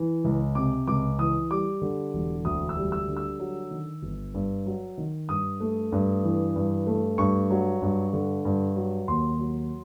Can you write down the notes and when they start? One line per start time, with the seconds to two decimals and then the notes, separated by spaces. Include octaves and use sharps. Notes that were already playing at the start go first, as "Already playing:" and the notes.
Already playing: E3
0.25 C#2
0.55 C3 D6
0.88 C#2 D6
1.19 E3 D#6
1.50 G3 D6
1.82 D3
2.14 E1
2.45 D2 D#6
2.69 E6
2.77 G3
2.92 E6
3.08 D3
3.17 E6
3.39 F#3
3.71 D#3
4.03 G1
4.34 G2
4.66 F#3
4.98 D#3
5.28 G2 D#6
5.61 A3
5.92 G2
6.24 E3
6.56 G2
6.87 A3
7.18 G2 C#6
7.50 F#3
7.82 G2
8.13 D3
8.45 G2
8.76 F#3
9.08 D#2 C6
9.39 F#3